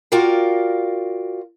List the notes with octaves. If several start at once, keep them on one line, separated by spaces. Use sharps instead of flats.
F4 F#4 A#4 D5 F5 G5